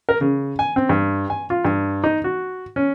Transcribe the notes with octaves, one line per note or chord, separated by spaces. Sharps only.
A#4
C#3
G#5
C4
G2
G#5
F4
G2
D#4
F#4
C#4